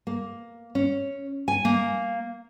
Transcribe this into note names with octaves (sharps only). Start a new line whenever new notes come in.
A#3
C#4
G#5
A#3